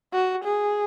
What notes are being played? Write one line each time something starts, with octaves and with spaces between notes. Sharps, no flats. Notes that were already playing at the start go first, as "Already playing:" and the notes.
F#4
G#4